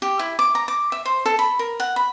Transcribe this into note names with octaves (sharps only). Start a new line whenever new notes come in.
G4
E4
D6
A#5
D6
E5
C5
A4
B5
A#4
F#5
B5